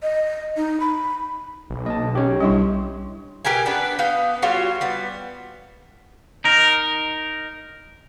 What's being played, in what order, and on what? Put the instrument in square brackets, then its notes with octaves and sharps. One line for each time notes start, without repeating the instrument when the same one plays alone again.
[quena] D#5
D#4
B5
[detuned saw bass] B1
[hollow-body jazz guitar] A#3 A5 [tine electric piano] D#5
[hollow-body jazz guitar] D3
[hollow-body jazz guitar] F#3 C#4 [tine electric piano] G4 C#5
[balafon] G3 D4 E4 [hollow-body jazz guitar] D#5 E5 C6
[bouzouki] B2 G4 A#4 G#5
B3 D4 B4
B3 F5 G5
G3 F4 F#4 C#5
G3 B3
[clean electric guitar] D#4 A#4